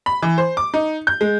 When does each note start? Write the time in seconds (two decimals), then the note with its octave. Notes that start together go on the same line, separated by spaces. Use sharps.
0.06 B5
0.22 E3
0.38 C5
0.57 D6
0.74 D#4
1.07 G6
1.21 G#3